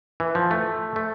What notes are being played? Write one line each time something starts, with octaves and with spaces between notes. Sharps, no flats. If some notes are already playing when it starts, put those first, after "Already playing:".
E3
F3
A3
A3